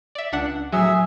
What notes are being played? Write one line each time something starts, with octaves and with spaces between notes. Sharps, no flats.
D5 E5
C#2 D4 F#5
A2 F#3 G#4 E5